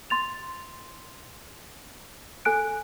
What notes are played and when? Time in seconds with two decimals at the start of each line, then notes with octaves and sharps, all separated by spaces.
0.10 C6 A6 F7
2.45 A4 G#5 F#6 D7